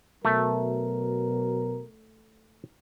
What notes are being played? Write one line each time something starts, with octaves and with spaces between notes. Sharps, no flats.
B2 F#3 A3 A#4